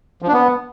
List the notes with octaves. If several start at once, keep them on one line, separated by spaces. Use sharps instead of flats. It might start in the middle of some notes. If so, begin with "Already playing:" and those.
F3
D4
B3